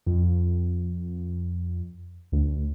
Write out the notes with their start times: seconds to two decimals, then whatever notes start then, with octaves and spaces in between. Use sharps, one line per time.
0.06 F2
2.32 D2